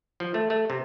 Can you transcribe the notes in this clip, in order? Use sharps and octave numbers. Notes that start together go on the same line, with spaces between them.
F3
A3
A3
C3